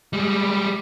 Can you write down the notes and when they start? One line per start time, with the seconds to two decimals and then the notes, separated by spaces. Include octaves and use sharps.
0.13 G3 G#3